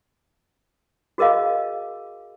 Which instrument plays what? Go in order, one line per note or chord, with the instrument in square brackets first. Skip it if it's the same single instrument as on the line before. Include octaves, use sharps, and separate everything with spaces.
[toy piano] F#4 G#4 A#4 D#5 F5